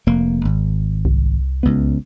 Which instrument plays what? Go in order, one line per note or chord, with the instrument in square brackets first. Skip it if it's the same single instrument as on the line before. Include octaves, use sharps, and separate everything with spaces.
[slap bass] F1 A#3
G#1
[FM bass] C2
[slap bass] C#2 B3